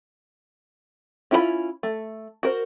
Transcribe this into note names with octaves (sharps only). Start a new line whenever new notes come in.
C#4 E4 F4 D#5 B5
A3
F#4 A#4 C5